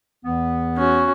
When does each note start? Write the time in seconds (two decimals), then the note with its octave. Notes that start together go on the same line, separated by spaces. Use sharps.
0.25 E2 E3 B3
0.77 C#4 F#4